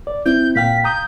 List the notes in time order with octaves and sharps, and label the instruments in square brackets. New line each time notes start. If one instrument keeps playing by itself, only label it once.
[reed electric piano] D5
[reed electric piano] C4 E4 [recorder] G6
[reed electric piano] A#2 F5 G5 [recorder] B6
[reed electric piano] A#5 D#6 [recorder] G6